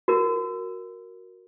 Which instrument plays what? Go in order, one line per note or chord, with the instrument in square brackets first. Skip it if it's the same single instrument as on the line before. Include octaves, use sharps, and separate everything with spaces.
[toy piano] F#4 A#4